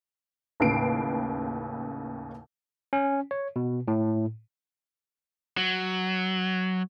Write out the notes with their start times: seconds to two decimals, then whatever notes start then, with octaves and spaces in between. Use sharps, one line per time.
0.60 A1 D#2 C#3 B4 C7 D7
2.93 C#4
3.31 C#5
3.56 B2
3.88 A2
5.57 F#3